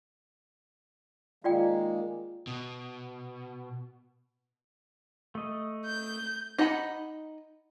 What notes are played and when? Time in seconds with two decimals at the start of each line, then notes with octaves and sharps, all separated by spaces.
1.44 D#3 G#3 A#3 F4 D5 G5
2.47 B2
5.35 A3 D#5
5.86 G6
6.58 D#4 D#5 F#5 A#5 B5